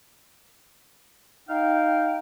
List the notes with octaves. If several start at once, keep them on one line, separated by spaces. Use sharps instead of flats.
D#4 F5 G5